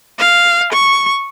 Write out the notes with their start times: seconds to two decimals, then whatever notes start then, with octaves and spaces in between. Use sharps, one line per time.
0.19 F5
0.72 C#6